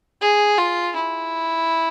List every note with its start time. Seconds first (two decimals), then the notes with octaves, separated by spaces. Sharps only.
0.21 G#4
0.58 F4
0.96 E4